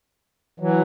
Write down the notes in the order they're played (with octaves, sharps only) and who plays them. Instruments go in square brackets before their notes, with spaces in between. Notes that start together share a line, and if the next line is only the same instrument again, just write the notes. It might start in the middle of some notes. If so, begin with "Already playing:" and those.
[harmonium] E3 F#3